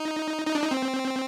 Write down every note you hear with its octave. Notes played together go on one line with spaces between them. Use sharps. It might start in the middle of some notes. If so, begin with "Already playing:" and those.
Already playing: D#4
D#4
D4
D#4
C4